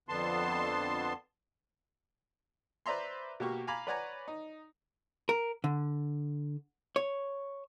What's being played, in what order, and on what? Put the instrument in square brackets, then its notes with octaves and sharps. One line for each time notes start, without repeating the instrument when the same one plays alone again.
[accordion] F2 D3 B3 A5 C6
[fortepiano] B4 C5 D5 E5 A#5 C6
B2 A#3 G4 C#6
F5 G#5 A#5 B5 D6
B4 C#5 D5 F#5 G#5 A#5
D#4
[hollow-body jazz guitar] A#4
D3
C#5